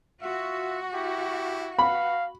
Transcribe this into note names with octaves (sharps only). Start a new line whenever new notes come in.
F4 F#4 E5
E4 G4
B4 F5 F#5 B5